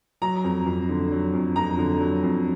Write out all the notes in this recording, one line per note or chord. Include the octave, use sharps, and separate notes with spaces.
F#3 A#5
F2
F2
D3
F#3
F2
F2 A#5
D3
F#3
F2